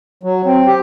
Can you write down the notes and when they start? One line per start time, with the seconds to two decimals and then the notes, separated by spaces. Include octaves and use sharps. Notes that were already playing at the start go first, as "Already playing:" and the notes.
0.23 F#3
0.46 C4
0.67 G4